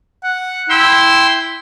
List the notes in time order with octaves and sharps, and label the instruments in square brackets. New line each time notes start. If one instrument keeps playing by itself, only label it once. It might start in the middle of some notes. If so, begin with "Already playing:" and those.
[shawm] F#5
[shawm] E4 [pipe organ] G5 C6 E6